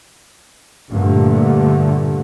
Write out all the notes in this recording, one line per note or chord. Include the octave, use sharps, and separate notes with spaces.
G2 A#2 D3 A3